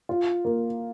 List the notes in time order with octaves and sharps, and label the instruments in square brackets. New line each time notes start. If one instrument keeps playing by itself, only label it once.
[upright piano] F4
A#3